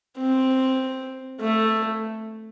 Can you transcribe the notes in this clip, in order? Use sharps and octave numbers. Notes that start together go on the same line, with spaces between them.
C4
A3